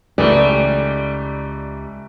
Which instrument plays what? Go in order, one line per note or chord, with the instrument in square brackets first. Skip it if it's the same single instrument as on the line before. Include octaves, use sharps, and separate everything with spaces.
[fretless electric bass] C#2 [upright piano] E3 A3 [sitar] G3 D#4 [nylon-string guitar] D5